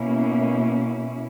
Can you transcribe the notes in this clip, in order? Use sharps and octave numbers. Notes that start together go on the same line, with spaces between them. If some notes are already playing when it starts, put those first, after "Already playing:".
Already playing: B2 A#3 C#4 E4